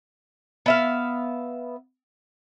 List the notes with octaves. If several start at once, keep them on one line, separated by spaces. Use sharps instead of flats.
B3 E5 F5